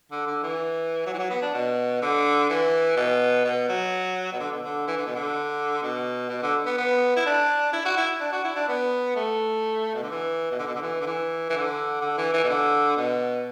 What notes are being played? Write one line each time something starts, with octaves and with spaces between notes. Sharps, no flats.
D3
D3
E3
F#3
E3
F#3
B3
D4
B2
D3
E3
B2
B2
F#3
B2
D3
B2
D3
E3
D3
B2
D3
B2
B2
D3
B3
B3
E4
D4
E4
F#4
E4
D4
F#4
E4
D4
B3
A3
B2
D3
E3
B2
D3
B2
D3
E3
D3
E3
E3
D3
D3
E3
E3
B2
D3
B2